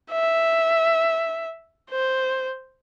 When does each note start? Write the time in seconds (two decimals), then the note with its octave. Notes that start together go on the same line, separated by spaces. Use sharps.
0.11 E5
1.90 C5